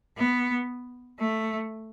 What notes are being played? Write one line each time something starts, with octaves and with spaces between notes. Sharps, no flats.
B3
A3